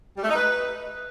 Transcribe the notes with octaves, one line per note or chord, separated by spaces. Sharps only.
G3
A3
D#4
B4